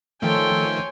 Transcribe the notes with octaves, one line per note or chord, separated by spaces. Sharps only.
D#3 F3 A3 A4 C#5 G5 G#5 C6